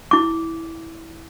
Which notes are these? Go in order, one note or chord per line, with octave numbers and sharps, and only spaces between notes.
E4 D6